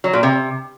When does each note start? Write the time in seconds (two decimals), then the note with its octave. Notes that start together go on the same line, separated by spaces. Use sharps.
0.04 F#3
0.13 A#2
0.23 C3